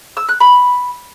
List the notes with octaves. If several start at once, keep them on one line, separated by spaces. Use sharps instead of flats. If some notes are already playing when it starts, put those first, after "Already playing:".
E6
F#6
B5